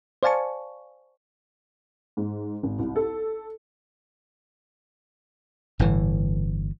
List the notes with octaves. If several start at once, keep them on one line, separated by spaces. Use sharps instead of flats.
C5 D5 F5 G#5 A5 C#6
G#2
G#1
C2
A4
G1 A2 E3